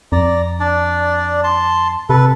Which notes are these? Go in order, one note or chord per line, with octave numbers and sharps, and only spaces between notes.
F2 D5 A#5
D4 D5
A5 C6
C3 A4 B4